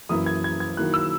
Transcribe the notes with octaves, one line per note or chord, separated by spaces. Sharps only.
F#2 E3 A#3 E4 D#6
G#6
G#6
G#6
D#3 F#3 A#3 E4 F#6
E6